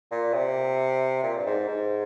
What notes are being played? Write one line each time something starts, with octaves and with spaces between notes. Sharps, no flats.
A#2
C3
A#2
G2
G#2
G#2